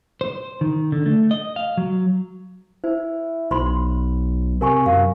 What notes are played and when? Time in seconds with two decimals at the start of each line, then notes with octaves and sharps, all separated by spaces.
0.21 C5
0.61 D#3
0.92 D3
1.06 A3
1.31 D#5
1.56 F5
1.77 F#3
2.84 E4 C5
3.51 B1 C5 B5 C6
4.61 C3 A#4 G#5 C#6
4.86 F#2 F5